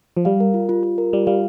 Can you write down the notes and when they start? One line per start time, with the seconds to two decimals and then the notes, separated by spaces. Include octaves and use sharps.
0.17 F3
0.25 G3 F5
0.40 A#4
0.54 F4
0.69 F4
0.83 F4
0.98 A#4
1.13 G3 F4
1.27 G3 F5